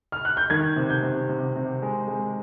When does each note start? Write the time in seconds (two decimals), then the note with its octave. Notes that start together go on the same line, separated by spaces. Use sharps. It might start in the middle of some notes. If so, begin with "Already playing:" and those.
0.12 F6
0.25 F#6
0.37 G6
0.50 D#3 G#6
0.76 C3
0.89 G6
1.03 C3
1.29 C3
1.56 C3
1.82 G#3
2.08 G#3